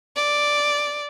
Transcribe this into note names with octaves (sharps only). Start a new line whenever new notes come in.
D5